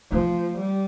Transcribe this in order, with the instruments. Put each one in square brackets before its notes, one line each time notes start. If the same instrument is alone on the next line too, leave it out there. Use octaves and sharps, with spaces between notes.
[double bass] F3 [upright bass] A3
[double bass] G3